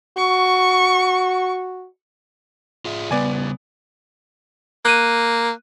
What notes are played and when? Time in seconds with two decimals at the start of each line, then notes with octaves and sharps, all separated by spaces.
0.17 F#4 C#6
2.85 F4 G#4 E5
3.11 C#3 G3 B3 D5 G#5
4.85 A#3 F#6 D#7